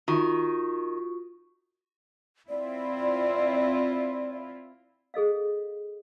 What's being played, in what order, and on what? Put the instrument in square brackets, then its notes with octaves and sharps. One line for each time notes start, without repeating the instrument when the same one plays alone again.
[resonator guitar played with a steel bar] D#3 [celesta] F4 F#4 C#6
[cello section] C4 E4 F4 [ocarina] D5
[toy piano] G#4 A4 D#5 F5